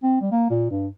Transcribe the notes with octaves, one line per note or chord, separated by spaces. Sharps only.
C4
G3
A#3
A#2
G2